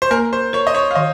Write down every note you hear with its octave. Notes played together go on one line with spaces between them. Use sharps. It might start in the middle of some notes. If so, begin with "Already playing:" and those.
C5
A#3 A#4
C5
A#4 C#5
D#5
C#5
F5
D#3 D#5